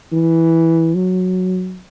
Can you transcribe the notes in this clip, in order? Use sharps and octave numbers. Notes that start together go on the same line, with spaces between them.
E3
F#3